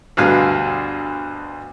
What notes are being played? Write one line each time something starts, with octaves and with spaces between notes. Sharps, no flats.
D2 G2 B2 F5 G#5